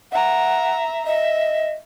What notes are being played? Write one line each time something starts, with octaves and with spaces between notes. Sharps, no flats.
E5 F#5 A#5
D#5 E5